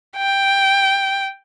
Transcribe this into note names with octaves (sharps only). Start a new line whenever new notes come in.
G5